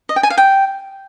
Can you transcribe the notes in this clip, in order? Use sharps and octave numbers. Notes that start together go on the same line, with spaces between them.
D#5
G5
G#5
F5
G5